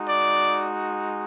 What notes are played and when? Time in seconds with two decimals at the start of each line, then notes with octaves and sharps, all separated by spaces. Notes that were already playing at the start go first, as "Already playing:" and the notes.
Already playing: G#3 D#4 F#4
0.09 D5